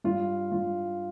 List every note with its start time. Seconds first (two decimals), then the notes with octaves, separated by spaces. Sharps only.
0.04 G2 F4
0.52 G2 F4